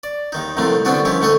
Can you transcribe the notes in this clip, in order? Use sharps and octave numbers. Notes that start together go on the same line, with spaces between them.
D5
D#2 D#3 D#4
C2 A2 C3 D#3 F3 A3
D3 G3 B3 C4 D4 F#4
D#3 F3 C#4 E4
D2 D3 A3 C#6 D#6